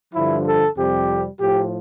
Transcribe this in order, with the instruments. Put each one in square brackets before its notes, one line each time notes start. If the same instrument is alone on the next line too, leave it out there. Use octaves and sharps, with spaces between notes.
[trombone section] G2 D3 F3 E4
A4
F2 C3 G3 G4
A2 F3 G4